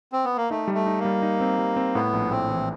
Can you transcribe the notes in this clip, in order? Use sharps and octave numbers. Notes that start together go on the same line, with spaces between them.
C4
B3
A#3
A3 D#4
G3
A3
D#4
A#3
G3
D#4
C4
G3
C4
A2 B3
A#1
A2 C4
E3